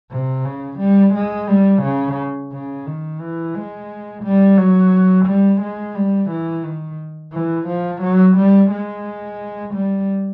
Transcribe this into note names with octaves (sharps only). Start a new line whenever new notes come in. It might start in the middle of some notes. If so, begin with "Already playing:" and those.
C3
C#3
G3
G#3
G3
C#3
C#3
D#3
E3
G#3
G3
F#3
G3
G#3
G3
E3
D#3
E3
F3
F#3
G3
G#3
G3